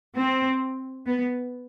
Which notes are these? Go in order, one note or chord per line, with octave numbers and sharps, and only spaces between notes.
C4
B3